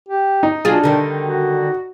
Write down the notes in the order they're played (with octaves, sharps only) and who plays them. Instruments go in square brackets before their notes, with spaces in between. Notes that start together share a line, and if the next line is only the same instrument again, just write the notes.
[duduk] G4
[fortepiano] D#4
[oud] F#3 F4 G#4 [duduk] D4
[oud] D3 D#3 G3
[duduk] F#4